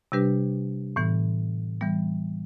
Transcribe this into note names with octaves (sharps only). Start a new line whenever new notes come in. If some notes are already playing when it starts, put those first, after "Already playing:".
C3 G3 D4 G4 B4
A2 E3 B3
E3 G3 B3